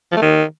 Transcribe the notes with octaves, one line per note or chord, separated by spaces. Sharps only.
F3
A3
D#3